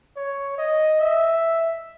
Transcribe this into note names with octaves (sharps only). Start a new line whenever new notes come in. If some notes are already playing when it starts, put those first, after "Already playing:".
C#5
D#5
E5